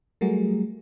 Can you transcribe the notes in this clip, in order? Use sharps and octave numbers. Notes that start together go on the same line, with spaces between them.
F#3 G3 A3 F#4 G#4 A#4